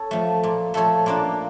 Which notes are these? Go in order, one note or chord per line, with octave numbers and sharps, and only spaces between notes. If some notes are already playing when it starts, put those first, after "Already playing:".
Already playing: A4 C#5
F3 A3
A#2
F3 A3 A4 C#5
A#2 A#3 D4